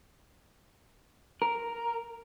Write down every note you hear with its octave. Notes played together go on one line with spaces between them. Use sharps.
A#4